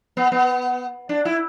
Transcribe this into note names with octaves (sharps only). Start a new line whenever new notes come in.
B3
B3
D4
E4